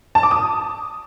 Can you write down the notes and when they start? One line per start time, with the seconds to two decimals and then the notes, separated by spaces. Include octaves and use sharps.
0.15 A5
0.23 D6
0.31 D#6